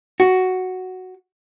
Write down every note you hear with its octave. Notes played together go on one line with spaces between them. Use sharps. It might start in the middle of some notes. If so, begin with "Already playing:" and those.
F#4